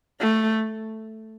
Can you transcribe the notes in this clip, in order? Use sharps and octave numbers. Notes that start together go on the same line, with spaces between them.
A3